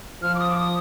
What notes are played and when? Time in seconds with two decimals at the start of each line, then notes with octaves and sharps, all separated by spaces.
0.22 F3 F6
0.35 D6
0.40 D#6
0.50 D6
0.58 D#6